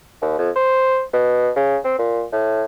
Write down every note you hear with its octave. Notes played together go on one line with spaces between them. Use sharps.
D#2
F2
C5
B2
C#3
C4
A#2
A2